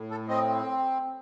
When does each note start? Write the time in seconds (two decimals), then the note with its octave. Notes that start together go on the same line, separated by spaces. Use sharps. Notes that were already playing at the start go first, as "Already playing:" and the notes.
Already playing: A2
0.11 A4
0.28 C4 D#5